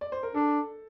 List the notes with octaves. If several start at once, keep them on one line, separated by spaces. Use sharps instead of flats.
D5
C5
A#4
D4 A4